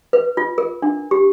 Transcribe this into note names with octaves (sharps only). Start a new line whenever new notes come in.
B4
F4
A#4
D4
G4